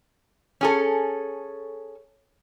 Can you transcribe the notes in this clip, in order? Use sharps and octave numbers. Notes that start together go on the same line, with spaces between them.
C#4 G#4 A4